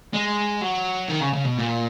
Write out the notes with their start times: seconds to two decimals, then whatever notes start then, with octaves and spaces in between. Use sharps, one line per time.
0.14 G#3
0.62 F#3
1.09 D#3
1.21 C#3
1.33 C#3
1.45 B2
1.57 A#2